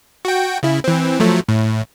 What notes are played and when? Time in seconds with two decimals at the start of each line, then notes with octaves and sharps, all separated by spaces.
0.25 F#4 G5
0.63 C#3 E4
0.84 E3 C4
1.20 F3 F#3 A3
1.49 A2